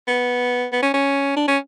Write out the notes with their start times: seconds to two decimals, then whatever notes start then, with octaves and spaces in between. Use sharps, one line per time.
0.08 B3
0.72 B3
0.82 C#4
0.94 C#4
1.36 D4
1.48 C#4